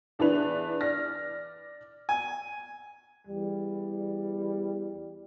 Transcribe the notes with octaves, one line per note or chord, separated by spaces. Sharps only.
E2 D4 E4 B4 F7
D5 F6 A#6
G#5
E2 G3